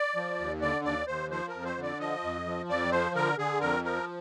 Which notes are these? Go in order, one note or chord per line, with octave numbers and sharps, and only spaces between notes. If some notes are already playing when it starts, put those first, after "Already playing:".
Already playing: D5
F3
D#2
D3 D5
D#2 D5
D#2 C5
F3 C5
A#4
F2
C5
D3
D5
F3 D#5
F2
F3
F2 D5
F3 C5
D3 A#4
D3 G#4
F2 A#4
F3 A#4